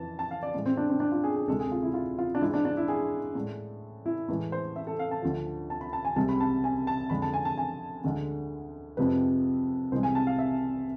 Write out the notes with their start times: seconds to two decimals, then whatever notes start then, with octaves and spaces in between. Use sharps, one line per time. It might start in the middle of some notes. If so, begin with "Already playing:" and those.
Already playing: F2 E3 A5
0.19 A5
0.31 F5
0.43 D5
0.54 A2 G#3
0.66 C4
0.77 D4
0.90 C4
1.00 D4
1.12 F4
1.24 G#4
1.36 G#4
1.47 D2 C3 G#3 A4
1.60 G#4
1.72 F4
1.83 E4
1.94 F4
2.18 F4
2.35 D4
2.41 G#2 G#3 E4
2.54 D4
2.65 D4
2.77 E4
2.88 G#4
3.35 A2 G#3
4.06 E4
4.29 A2 E3 G#3
4.52 C5
4.76 E5
4.87 A4
4.99 F5
5.11 A5
5.22 D2 D3 F3
5.70 A5
5.81 B5
5.93 A5
6.05 G#5
6.16 C2 C3 G#3 A5
6.29 B5
6.40 A5
6.64 G#5
6.87 A5
7.10 F2 D3 G#3 B5
7.22 A5
7.34 G#5
7.45 A5
7.57 G#5
8.04 D2 D3 G#3
8.97 F2 C3 F3 G#3 B4
9.92 C2 C3 E3 G#3 C5
10.03 G#5
10.15 A5
10.27 F5
10.39 E5